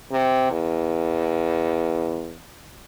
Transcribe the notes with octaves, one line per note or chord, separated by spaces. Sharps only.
C3
E2